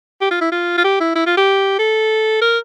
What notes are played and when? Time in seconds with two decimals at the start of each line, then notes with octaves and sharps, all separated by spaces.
0.21 G4
0.31 F4
0.41 E4
0.52 F4
0.78 F4
0.84 G4
1.00 E4
1.15 E4
1.26 F4
1.37 G4
1.79 A4
2.42 A#4